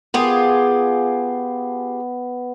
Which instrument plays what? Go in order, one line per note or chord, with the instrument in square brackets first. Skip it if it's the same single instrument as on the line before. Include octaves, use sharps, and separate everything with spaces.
[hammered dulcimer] B3 [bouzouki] F4 G4 G#4